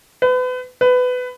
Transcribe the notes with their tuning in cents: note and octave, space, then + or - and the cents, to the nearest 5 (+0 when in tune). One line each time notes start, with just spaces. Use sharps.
B4 +35
B4 +20